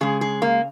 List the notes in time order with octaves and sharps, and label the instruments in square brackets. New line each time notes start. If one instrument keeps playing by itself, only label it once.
[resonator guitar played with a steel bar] C#3 G#3 G#4
G#4
A#3